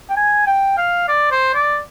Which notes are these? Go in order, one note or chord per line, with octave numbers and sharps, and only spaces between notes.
G5
G#5
G5
F5
D5
C5
D5